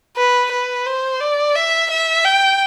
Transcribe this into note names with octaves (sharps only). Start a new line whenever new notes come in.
B4
B4
C5
D5
E5
E5
G5